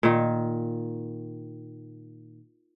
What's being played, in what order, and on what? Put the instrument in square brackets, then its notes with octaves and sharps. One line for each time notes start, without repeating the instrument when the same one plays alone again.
[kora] A#2 D#3